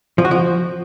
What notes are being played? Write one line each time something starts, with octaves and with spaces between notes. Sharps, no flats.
F3
F#4
F3